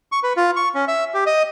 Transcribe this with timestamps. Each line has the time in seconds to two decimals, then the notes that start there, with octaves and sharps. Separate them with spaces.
0.12 C#6
0.23 B4
0.37 F4
0.56 C#6
0.75 C#4
0.88 E5
1.14 G4
1.26 D#5